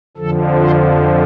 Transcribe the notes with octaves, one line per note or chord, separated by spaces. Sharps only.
F2 D3 F3 A4
C5